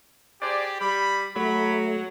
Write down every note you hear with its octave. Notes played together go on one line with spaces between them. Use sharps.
G4 G#4 C5 D5
G3 B5
F#3 A3 B5